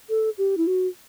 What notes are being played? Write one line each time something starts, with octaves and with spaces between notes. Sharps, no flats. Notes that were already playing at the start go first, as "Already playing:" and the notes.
A4
G4
E4
F#4